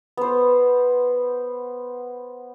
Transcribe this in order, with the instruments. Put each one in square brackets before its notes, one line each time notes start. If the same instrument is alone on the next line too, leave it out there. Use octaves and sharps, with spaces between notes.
[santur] B3 C5